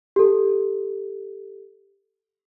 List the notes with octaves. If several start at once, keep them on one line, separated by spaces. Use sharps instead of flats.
G4 A4